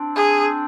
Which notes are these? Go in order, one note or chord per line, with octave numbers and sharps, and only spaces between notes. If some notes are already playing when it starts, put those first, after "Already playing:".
Already playing: C4 D4
G#4